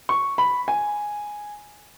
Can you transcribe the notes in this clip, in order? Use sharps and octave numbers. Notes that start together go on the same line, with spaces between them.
C#6
B5
G#5